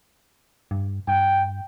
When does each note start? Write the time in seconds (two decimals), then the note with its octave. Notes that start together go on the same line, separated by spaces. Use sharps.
0.71 G2
1.08 G2 G5